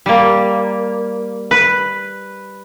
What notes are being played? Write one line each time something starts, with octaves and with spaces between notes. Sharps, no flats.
G3 A#3
B4